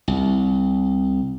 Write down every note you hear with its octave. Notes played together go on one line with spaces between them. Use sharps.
C2